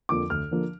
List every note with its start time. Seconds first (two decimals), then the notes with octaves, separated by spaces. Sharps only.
0.09 F2 D3 F3 A#3 D6
0.30 D2 F6
0.51 D3 F3 A#3